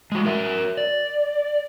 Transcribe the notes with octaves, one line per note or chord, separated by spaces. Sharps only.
G#3 F#4
F#4 A#4 E5
D5